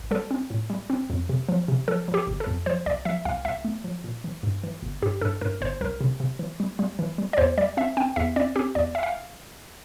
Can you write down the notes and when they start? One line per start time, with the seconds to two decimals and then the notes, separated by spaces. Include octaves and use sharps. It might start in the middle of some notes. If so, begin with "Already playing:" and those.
Already playing: A1
0.11 G3 A4
0.31 C4
0.50 A2
0.70 G3
0.90 C4
1.10 F2
1.29 C3
1.49 F3
1.68 C3
1.88 F3 A4
2.08 F3
2.14 G4
2.27 G1
2.40 A4
2.47 F2
2.66 F3 C5
2.86 C2 D5
3.05 F3 E5
3.25 C2 F5
3.45 C2 E5
3.65 A3
3.84 F3
4.04 A#2
4.24 E3
4.43 G2
4.63 E3
4.82 G1
5.02 G2 G4
5.21 G2 A4
5.41 G2 A#4
5.61 G1 C5
5.81 C2 A#4
6.01 C3
6.20 C3
6.39 E3
6.60 G3
6.79 G3
6.99 E3
7.18 G3
7.33 D5
7.38 E2 C5
7.58 G3 D5
7.77 C4 E5
7.97 C4 G5
8.16 E2 E5
8.36 C4 D5
8.56 C4 G4
8.75 E2 D5
8.95 E5
9.03 F5